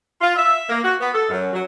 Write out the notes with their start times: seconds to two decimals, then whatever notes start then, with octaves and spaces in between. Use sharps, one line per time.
0.21 F4
0.36 E5
0.69 A#3
0.84 F#4
1.00 B3
1.14 A4
1.29 F#2
1.53 F#3